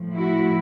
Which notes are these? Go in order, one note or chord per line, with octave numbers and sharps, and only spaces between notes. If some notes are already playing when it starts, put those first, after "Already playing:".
Already playing: A2 F3
E4 F#4